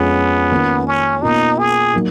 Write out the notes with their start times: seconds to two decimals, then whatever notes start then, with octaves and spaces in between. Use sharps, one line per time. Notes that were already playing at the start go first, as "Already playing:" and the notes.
Already playing: F2 F3 G#3 B3 C#4 F4
0.51 D#3 A#3 C#4 F4
0.87 C#4
1.22 B2 A#3 D#4 F4
1.59 G#4
1.93 F#3 A#3 D#4